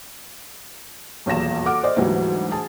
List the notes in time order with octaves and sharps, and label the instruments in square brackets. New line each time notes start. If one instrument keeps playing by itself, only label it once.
[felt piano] D#1 B1 E2 A5 A#6 E7
A4 F#5 D6 F6
C5 D5 D#5
D2 G#2 E3 F#3 G3
G#4 A5